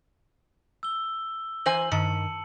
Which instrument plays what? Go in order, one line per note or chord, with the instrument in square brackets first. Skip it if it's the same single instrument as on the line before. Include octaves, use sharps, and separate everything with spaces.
[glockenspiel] E6 G7
[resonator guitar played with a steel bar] E3 C5 G#5 [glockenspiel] F#7
[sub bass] G2 [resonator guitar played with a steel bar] D#3 [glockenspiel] A5 C#7